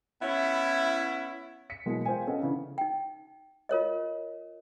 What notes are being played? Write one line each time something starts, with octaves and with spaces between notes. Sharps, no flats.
B3 C#4 E4
B6 C#7
B2 E3 F#3 G#3 A#3 B3
F4 C5 F5 G5 G#5
B3 C#4 A4 D#5 F5 F#5
C#3 E3 D4
D#4 G5
F4 A#4 C#5 D#5